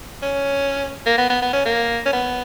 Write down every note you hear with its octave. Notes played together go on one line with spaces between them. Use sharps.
C#4
A#3
B3
B3
B3
C#4
A#3
C#4
B3